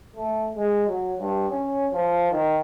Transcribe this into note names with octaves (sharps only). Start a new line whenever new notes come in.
A3
G#3
F#3
G2
C#4
F3
D#3